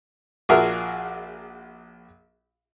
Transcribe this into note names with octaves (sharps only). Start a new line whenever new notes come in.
A#1 F4 F#4 G#4 A#4 E5